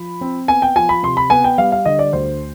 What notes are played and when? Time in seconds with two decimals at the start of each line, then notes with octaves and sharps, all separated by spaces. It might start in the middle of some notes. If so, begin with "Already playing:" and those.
Already playing: F3 B5
0.21 C4
0.48 B3 G#5
0.62 G5
0.76 F3 G#5
0.89 B5
1.03 C3 C6
1.17 B5
1.30 B3 G#5
1.44 G5
1.58 G3 F5
1.72 F5
1.86 D3 D#5
1.99 D5
2.13 D2 C5